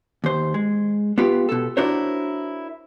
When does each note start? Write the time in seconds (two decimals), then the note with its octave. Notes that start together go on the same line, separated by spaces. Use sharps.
0.24 D#2 C5
0.54 G#3
1.18 B3 F4 G4
1.49 B2 A4
1.77 D4 E4 F#4 A#4 C5 C#5